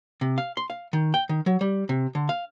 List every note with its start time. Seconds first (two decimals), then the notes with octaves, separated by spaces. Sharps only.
0.21 C3
0.38 F5
0.57 C6
0.70 F5
0.93 D#3
1.14 G5
1.29 D#3
1.46 F#3
1.61 G3
1.89 C3
2.15 D3
2.29 F5